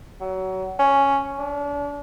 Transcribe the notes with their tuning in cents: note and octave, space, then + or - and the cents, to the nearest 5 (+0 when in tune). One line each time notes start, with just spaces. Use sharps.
F#3 +25
C#4 +0
D4 -35